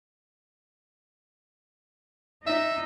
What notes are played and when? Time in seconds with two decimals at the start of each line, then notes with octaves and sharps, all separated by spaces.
2.47 D#4 E5